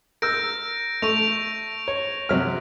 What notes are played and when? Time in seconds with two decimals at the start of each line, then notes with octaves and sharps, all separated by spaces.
0.22 A#4 E6 G6 A#6 D7
1.02 A3 C#6 D7 F7
1.88 C#5
2.29 C3 F#3 F6